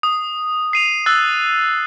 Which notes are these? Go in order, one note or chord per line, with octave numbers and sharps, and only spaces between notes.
D#6
C7 D#7 F7
E6 F#6 A6